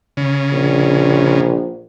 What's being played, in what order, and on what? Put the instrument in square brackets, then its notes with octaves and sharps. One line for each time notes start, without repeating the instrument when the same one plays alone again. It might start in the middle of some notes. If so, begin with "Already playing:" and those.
[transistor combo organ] C#3
[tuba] A#1